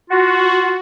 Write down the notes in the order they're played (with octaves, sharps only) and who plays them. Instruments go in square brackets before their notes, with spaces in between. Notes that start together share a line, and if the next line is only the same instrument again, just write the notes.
[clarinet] F4 [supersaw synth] F#4